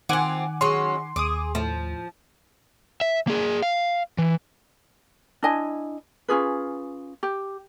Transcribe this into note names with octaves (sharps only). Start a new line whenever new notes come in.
D#3 C4 F4 F#5 G#5 D6
F#3 G#3 C#4 C6
D#2 G#4 D6 D#6
A2 F3
E5
A#3 G#4
F5
E3
D4 E4 D#5 G#5
C#4 F4 G#4 B4
G4